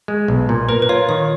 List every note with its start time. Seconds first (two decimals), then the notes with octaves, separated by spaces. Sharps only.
0.08 G#3
0.28 B1
0.49 A#2
0.69 A#4 B4
0.82 B4
0.89 F4 C#5
1.09 D#3 C#5